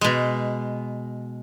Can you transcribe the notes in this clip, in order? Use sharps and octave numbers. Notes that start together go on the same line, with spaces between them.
B2 G#3